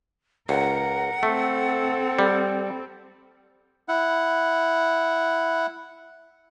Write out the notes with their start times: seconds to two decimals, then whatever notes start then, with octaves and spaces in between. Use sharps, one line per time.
0.49 C#2 A#4 F#5
1.23 A3 C4 A4
2.19 G3
3.88 E4 F#5